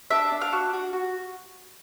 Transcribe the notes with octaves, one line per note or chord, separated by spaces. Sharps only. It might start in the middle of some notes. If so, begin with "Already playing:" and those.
D4 E5
D4
F5
F#4
F#4
F#4